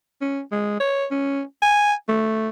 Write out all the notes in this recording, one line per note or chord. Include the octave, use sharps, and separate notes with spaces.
C#4
G#3
C#5
C#4
G#5
A3